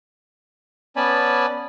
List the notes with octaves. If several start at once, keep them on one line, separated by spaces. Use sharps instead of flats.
B3 C#4 D5 G#5 A5 B5